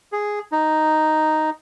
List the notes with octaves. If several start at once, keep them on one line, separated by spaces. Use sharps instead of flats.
G#4
D#4